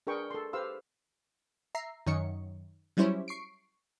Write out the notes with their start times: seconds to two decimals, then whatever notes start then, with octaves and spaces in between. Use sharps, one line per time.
0.07 D4 G#4 A#4 B4 G5 C#6
0.31 A4 C6
0.53 G4 B4 C5 F5 C6 E6
1.75 E5 A#5 C7
2.07 F#2 D#3 C#5 D#5 C#7
2.97 F#3 G3 C#4 E4 C5 C#5
3.28 C#6 C7 D7